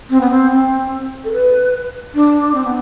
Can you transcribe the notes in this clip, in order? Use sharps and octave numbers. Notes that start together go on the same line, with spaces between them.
C4
B3
C4
C4
A4
B4
D4
C4
B3